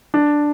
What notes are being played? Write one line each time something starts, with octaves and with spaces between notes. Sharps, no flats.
D4